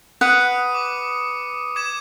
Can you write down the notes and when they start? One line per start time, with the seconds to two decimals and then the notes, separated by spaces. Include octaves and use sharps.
0.21 B4 F#5 D#6 C#7 D#7
0.75 D6
1.76 D6 G#6 E7